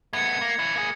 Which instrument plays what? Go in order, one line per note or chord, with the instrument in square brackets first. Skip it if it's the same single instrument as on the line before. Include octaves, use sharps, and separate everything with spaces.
[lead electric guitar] A3 B3 [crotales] G#6 C#7
[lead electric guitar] A#3
C#4 E4
A#3 G#4